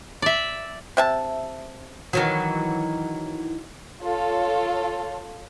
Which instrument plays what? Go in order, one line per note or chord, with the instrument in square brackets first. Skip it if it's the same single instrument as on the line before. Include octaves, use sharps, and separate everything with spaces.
[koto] D5 E5
[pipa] C3 E5 A5
[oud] D#3 E3 F#3
[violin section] F4 A4 C#5